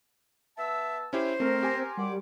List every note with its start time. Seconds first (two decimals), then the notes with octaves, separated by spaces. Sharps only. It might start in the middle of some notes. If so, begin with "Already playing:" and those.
0.58 B3 E5 A5 E6
1.13 C#4 E4 G4 C5
1.40 A3 C4 A#4
1.63 G4 G#5 C6
1.97 F#2 G3 F#5 D6